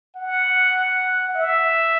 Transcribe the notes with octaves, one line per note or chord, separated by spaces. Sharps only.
F#5
E5